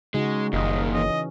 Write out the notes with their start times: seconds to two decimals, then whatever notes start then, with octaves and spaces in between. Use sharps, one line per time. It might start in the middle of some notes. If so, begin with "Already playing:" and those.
0.14 C#3 G#3 D#4 F#4
0.53 F#1 A#2 D#3 D#5
0.93 E3 C#4 D#5